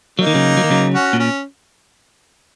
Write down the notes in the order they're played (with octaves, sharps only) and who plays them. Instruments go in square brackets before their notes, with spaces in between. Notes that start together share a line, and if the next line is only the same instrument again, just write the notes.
[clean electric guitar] F#3 [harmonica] A#3 D#4
[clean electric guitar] D#3
C#3 F#3
F#3
D#3
C#3 F#3
[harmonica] C#4 F#4
[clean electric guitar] A#2
[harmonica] C#4